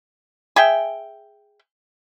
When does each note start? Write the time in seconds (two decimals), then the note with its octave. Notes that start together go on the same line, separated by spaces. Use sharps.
0.56 G#4 E5 G5